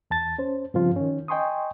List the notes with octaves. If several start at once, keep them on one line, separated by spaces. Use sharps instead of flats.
E2 A5 A6
C#4 C5
G2 C#3 F3 C4 F4
D#3 C#4
D#5 G5 G#5 C6 C#6 D#6